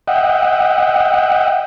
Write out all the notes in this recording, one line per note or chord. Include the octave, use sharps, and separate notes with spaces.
D#5 E5 F#5 G5